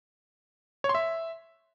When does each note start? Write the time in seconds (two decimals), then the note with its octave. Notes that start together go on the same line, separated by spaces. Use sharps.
0.84 C#5
0.89 C6
0.95 E5